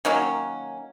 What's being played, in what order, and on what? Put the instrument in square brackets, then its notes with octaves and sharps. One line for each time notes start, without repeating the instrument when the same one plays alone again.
[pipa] D#3 F#3 A#3 C#4